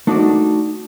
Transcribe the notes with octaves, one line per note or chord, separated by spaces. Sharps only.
A3 D4 D#4 F#4 B4 D5